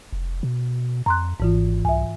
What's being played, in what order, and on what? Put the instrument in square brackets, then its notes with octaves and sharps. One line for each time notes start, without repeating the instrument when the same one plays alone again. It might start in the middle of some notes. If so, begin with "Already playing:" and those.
[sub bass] F1
B2
[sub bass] F2 [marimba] A#5 C6 F#6
[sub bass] G#1 [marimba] G#2 E3 F4
[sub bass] C2 [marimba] E5 G#5